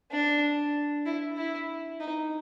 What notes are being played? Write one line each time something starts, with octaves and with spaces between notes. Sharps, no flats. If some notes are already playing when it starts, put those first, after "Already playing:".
D4
E4
E4
D#4